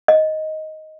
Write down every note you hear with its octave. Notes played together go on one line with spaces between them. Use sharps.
D#5